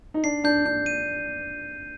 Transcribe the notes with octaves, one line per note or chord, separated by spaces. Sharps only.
D#4
D4 C7
D4 G6
D4 G6
D#7